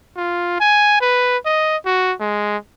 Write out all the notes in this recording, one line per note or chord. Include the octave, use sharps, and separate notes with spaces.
F4
G#5
B4
D#5
F#4
G#3